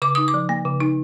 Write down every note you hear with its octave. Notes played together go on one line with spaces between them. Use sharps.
C#3 D6
D#4 D#6
D6
F3
A#3
C#3
D#4